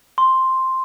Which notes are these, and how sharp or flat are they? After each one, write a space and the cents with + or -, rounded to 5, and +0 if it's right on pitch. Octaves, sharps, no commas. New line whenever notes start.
C6 +0